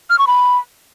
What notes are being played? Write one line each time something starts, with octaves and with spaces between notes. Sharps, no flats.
F6
C#6
B5